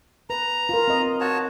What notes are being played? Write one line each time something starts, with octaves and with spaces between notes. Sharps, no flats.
B4 A#5
F4 A#4
C4 D#5
F#4 C#5 A5